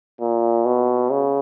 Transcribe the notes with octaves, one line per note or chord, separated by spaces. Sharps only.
A#2
B2
C#3